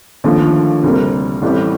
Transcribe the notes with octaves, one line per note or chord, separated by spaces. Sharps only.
D#2 D3 F3 A3
D2 C3 G3 A#3
A1 A2 G3 C4 G4